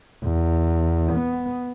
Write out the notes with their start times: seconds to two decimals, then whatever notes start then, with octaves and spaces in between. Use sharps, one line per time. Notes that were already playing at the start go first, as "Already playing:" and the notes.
0.24 E2
1.13 B3